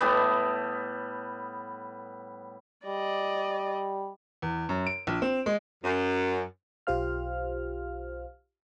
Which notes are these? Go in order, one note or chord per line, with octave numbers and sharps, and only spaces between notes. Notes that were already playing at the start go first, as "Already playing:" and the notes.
A2 G3 B3
G3 D5 D#5
E2
F#2
D7
A#1
C4
G#3
F#2
B1 F4 G4 C5 F5 F6